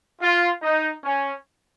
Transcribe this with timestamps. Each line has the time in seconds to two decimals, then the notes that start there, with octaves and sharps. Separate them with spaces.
0.21 F4
0.62 D#4
1.03 C#4